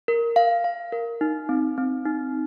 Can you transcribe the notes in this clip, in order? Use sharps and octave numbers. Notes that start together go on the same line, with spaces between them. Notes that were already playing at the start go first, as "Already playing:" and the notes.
A#4
F5
F5
A#4
D#4
C4
C4
D#4